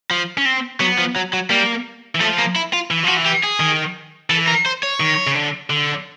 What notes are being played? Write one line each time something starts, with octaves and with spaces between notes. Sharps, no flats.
F3
C#4
C4
F#3 B3
F3
F#3
F#3
G3 A#3
E3
F3 A3
A#3
E4
F4
E3
F3 F#4
E3
G4
G#4
D#3
E3 A4
A#4
C5
C#5
D#3
C#3
D3
D3